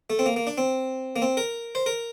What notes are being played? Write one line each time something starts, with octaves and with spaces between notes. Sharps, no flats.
A3
C4
A#3
A#3
D4
C4
A#3
C4
A#4
C5
A#4